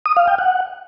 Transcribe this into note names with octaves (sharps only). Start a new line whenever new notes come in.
D#6
F5
G5
F#5